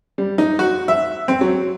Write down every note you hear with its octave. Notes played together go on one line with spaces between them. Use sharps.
G3
D#4
F#4
E5
C4
F#3